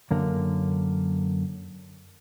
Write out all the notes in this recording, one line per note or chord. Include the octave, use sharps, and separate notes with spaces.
F#2 D3 A#3